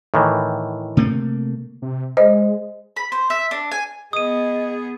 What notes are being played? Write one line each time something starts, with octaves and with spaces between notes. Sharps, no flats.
A2 D#3 E3
C3 A3 A#3
C3
G#3 C5 D#5
B5
C5
E5
D4
G#5
B3 G#4 D#5 D#6 D#7